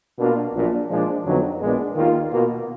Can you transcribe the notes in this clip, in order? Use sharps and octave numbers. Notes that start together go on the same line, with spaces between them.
B2 A#3 D4 F4
A#1 A#2 F#3 A#3 D4
A#2 F3 G#3 D4
F2 D3 F#3 B3 D#4
A#1 A#2 G#3 B3 D4
D#2 D#3 A#3 F4
B2 A#3 F4